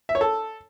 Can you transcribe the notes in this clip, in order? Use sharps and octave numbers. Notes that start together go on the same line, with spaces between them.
E5
C#5
A4